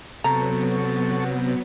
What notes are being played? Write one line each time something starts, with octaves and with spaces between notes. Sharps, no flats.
C3 F#3 B3 A4 A5 A#5 C#6